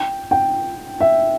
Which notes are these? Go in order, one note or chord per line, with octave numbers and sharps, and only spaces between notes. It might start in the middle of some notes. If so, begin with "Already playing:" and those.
Already playing: G5
G5
E5